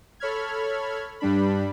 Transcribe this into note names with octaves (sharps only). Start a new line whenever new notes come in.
A4 C#5 B5 F6 G#6
G2 G3 D4 B5